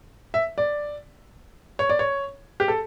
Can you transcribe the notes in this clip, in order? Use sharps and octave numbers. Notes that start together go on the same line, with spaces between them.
E5
D5
C#5
D5
C#5
G4
A4